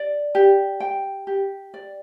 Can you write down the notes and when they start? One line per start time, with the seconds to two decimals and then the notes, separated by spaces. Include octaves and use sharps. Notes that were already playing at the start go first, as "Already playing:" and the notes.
Already playing: D5
0.35 G4
0.80 G5
1.27 G4
1.74 D5